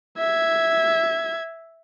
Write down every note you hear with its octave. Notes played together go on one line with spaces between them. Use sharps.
E5 G#6